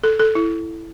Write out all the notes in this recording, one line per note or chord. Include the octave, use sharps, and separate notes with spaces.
A4
A4
E4